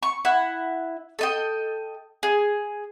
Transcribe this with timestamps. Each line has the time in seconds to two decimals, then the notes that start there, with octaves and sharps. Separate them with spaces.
0.03 C#6
0.25 E4 F#5
1.19 A4 D#5 G5
2.23 G#4